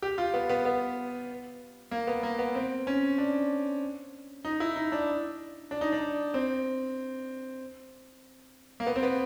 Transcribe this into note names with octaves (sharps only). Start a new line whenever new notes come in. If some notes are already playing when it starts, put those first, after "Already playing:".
G4
F4
B3
B3
B3
A#3
B3
A#3
B3
C4
C#4
D4
D#4
E4
D#4
D4
D4
D#4
D4
C4
A#3
B3
C4
B3